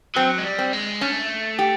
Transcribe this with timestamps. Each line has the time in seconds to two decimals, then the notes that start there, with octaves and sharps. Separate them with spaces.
0.16 F#3 C4
0.38 G#3
0.44 G3
0.59 C4
0.73 G#3
1.01 A3 C#4
1.59 G4